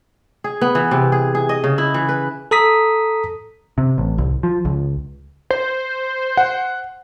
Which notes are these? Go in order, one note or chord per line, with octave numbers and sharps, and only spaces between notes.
G#4
B3
E3
C3
G#4
G#4
D#5
C#3
E4
E3
B4
A4 A#5 D#6 B6
C3
A1
C2
F3
C#2
C5
F#5